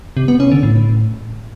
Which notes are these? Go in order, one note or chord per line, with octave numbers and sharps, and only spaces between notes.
C3
B3
C#4
D3
A2